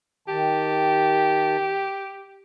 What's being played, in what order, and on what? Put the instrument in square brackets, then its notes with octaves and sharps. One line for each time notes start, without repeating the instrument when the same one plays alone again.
[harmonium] D#3 A5 [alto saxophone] G4